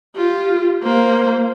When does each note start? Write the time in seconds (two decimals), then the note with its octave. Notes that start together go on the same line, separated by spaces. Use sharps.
0.16 F4 G4
0.83 A#3 C5